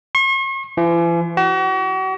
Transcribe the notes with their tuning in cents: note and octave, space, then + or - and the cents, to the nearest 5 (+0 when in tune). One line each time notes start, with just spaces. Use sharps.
C#6 -45
E3 +45
F#4 +40